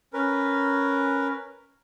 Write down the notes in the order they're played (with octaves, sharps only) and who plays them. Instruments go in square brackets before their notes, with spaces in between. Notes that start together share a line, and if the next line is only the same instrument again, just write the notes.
[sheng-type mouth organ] C#4 A#4 B4